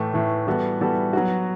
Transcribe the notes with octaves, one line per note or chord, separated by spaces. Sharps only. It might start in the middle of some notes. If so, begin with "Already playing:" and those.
Already playing: A2 E3 A3
A2 E3 A3
E3 G3 B3 F#4 A4
E3 G3 B3 F#4 A4
F#3 B3 F#4